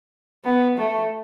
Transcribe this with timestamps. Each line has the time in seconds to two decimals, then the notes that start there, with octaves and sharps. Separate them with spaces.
0.44 B3
0.77 A3